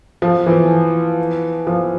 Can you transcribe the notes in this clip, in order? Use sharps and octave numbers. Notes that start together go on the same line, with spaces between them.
F3
E3
F3